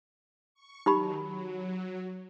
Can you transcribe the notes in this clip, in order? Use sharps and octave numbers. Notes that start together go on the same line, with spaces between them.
C#6
D#3 F#3 D#4 G4 B5
F#3